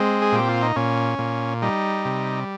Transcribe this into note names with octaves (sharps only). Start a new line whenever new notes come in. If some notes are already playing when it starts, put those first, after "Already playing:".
Already playing: G#3 C4
G#4
A#2 G4
F4
D#4
A#2 C#4
A#2
G3 D#4
C3